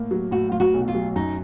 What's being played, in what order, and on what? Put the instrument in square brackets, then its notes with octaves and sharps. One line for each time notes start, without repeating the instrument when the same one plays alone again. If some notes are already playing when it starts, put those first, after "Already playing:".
Already playing: [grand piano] A2 A#3
F#3
[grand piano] A2 [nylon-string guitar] F#4
[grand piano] A2 [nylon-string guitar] F4
[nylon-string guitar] F#4
[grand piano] B1
[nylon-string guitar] F4
[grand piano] F#3
[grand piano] F#2 [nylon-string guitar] D#4